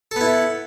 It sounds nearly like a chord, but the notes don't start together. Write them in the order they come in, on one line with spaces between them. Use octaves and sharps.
A4 B3 E4